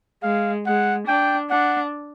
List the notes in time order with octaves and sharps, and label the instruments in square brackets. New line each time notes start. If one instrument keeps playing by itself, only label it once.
[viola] G#3 [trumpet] F5
[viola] G#3 [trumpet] F#5
[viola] D4 [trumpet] G5
[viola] D4 [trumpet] F#5